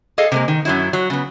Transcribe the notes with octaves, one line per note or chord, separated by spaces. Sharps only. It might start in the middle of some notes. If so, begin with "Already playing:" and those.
G#4 A4 D#5 F5
C3 G#3 A#3
D#3
F#2 F#3 E4
F#3
C#3 B3